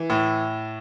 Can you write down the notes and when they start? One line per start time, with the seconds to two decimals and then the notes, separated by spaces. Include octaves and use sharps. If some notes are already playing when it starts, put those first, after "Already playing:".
Already playing: E3
0.10 A2